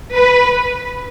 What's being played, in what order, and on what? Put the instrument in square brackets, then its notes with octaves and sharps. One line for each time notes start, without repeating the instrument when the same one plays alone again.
[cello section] B4